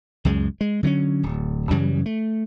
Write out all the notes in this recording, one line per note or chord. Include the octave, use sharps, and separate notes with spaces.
C#2 F#2 G#3
G#3
D3 F#3 A3 C#4
D1
F#2 C#3 E3 G3
A3